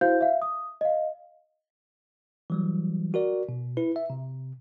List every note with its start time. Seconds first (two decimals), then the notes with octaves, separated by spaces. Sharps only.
0.01 E4 F#4 C5 F5 G6
0.21 E5 F5
0.42 D#6
0.81 D#5 F5
2.50 E3 F#3 G3
3.14 F#4 A#4 D5
3.49 B2
3.77 E4 B4
3.96 E5
4.10 C3